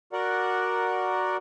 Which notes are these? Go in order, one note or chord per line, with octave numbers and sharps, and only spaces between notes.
F#4 A#4 D5 F#5